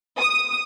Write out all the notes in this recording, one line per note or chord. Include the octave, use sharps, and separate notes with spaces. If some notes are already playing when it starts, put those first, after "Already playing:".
D#6